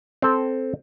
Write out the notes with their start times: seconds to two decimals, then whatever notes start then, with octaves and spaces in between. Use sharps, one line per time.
0.22 C4 A4